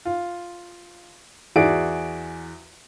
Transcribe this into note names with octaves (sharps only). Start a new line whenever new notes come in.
F4
E2 F#4 G#4 D5 E5 D7